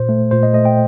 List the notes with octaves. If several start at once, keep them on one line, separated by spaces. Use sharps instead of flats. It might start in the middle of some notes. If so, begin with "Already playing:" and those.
Already playing: A#2 C5
A3
A#2 C5
D#5
A3 D#5
G5